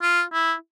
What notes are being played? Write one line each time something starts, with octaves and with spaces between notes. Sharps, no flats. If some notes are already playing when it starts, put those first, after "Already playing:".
F4
E4